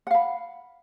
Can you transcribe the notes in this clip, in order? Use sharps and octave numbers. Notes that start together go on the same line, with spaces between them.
F5 F#5 B5